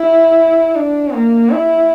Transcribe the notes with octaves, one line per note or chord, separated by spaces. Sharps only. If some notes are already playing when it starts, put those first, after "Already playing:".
Already playing: E4
D4
A#3
E4